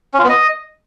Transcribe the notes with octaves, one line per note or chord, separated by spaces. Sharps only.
C#4
F4
B3
D#5